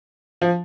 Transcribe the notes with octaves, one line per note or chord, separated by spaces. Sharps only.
F3